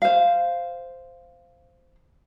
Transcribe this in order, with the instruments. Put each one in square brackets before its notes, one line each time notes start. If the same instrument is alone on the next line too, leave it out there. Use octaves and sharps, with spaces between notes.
[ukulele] C5 F5